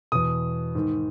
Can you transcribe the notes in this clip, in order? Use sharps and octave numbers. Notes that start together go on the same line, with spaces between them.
E2 B2 D#6
G#2 D#3